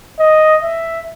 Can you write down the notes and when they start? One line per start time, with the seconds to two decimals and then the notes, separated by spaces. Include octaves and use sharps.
0.19 D#5
0.63 E5